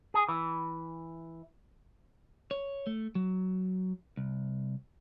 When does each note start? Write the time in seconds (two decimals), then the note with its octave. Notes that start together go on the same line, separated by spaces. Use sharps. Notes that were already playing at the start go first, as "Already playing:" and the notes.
0.14 G#4
0.28 E3
2.51 C#5
2.87 A3
3.15 F#3
4.17 C2